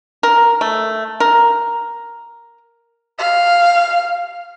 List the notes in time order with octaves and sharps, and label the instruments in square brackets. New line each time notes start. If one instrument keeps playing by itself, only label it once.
[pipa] A#4
A3
A#4
[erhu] F5